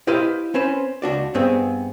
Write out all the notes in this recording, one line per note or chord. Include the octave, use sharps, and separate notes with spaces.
E4 G4 B4 C5 D#5 F5
C4 C#4 B4 C5
C#2 D4 F#4 D5
G2 B3 C4 G#4